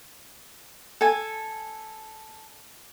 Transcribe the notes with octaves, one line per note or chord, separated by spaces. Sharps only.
A4 G#5